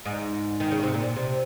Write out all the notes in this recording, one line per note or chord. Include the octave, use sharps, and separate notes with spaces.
G#2
D#3
C#3
C3
A#2
C3